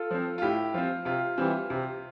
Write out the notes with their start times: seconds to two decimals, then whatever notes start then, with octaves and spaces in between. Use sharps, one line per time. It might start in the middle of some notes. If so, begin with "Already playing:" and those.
Already playing: F4 A4
0.10 F3 C4
0.38 F4
0.42 A2 E4 G4
0.74 F3 C4 F4
1.05 C3 F4
1.38 E3 G3 C4
1.70 C3